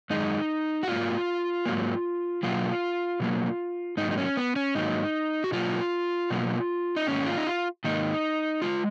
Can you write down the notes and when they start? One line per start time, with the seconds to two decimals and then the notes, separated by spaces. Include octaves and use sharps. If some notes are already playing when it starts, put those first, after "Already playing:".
0.10 F#2 D#3 G#3 D#4
0.83 F#4
0.88 G#2 F#3 A#3 F4
1.66 G#2 F#3 A#3
2.43 B2 F#3 A#3 F4
3.20 B2 F#3 A#3
3.97 G#2 D#3 F#3 A#3 D#4
4.11 D#4
4.18 C#4
4.37 B3
4.56 C#4
4.75 G#2 D#3 F#3 A#3 D#4
5.44 F#4
5.52 B2 F#3 A#3 F4
6.30 B2 F#3 A#3
6.96 D#4
7.07 G#2 D#3 A#3 C#4
7.26 F4
7.38 D#4
7.47 F4
7.84 G#2 D#3 A#3 D#4
8.62 C#3 G#3 F4